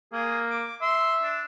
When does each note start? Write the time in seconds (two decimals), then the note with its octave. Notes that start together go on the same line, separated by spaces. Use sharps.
0.13 A#3 G#4
0.51 D6
0.82 E5 C6
1.23 D4